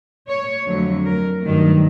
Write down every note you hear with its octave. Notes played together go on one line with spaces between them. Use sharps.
C#5
F2 D3 F#3 A3
A#4
G2 D#3 F#3 A3